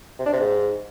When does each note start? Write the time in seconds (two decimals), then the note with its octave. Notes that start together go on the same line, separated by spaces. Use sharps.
0.19 C3
0.26 D4
0.33 C3
0.40 G#2